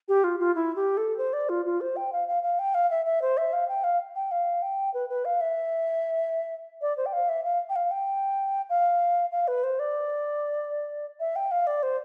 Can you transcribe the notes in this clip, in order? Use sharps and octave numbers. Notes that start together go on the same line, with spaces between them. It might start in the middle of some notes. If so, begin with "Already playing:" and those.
G4
F4
F4
E4
G4
A4
C5
D5
F4
F4
C5
G5
F5
F5
F5
G5
F5
E5
E5
C5
E5
F5
G5
F5
G5
F5
G5
B4
B4
F5
E5
D5
C5
G5
F5
E5
F5
G5
F5
G5
F5
F5
B4
C5
D5
E5
G5
F5
D5
C5